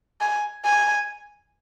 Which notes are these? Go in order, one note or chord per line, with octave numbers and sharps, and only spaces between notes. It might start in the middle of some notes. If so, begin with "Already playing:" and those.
G#5
G#5